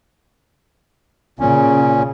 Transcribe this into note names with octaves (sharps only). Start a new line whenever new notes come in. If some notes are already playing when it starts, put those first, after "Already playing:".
A#2 C#3 C#4